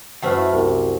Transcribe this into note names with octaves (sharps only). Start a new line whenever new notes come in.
F#2 A3 B4 C5 F#5 B5
E4
C2 C5